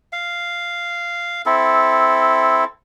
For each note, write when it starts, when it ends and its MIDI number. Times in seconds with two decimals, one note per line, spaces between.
0.13 1.42 77
1.46 2.64 60
1.46 2.64 64
1.46 2.64 69